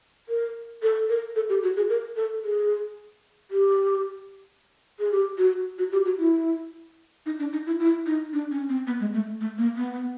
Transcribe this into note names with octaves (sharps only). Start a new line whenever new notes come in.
A#4
A4
A#4
A4
G4
F#4
G#4
A#4
A4
G#4
G4
G#4
G4
F#4
F#4
G4
F#4
E4
D#4
D4
D#4
E4
E4
D#4
D4
C#4
C4
B3
G#3
A3
A3
A#3
B3